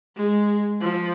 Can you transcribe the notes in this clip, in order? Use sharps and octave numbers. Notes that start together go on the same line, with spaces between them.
G#3
F3